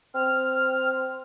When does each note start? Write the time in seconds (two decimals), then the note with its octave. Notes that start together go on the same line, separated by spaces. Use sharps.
0.14 C4 F6